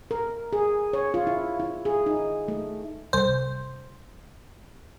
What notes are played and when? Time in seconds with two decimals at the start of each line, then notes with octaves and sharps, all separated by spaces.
0.11 A#4
0.53 G#4
0.93 C#5
1.14 F4
1.27 E4
1.60 E4
1.85 G#4
2.06 D#4
2.48 A3
3.13 C2 C5